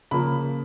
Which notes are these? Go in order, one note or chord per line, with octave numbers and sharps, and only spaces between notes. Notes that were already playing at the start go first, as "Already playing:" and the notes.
C#3 F3 A#3 B5